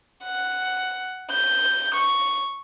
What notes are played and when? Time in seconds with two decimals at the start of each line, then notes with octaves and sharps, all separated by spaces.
0.25 F#5
1.31 G6
1.94 C#6